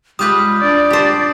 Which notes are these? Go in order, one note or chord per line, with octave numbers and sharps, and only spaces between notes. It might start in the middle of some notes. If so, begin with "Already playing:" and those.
G3 G#3 F4 B4 D#6 G6
D4 D5
G4 C5